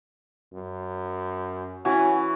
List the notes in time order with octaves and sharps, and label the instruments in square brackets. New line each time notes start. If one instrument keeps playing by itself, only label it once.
[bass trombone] F#2
[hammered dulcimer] E3 F#4 [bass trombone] C#4